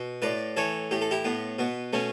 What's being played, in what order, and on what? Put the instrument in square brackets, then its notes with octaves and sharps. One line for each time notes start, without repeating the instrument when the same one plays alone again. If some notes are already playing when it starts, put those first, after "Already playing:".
Already playing: [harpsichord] B2
A2 B4 D5
E3 A4 C#5
A2 G4
A4
E4 G4
A2 B3
B2 B3
B2 A3 C#4